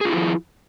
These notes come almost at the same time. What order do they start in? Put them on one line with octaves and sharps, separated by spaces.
G#4 F4 E4 F3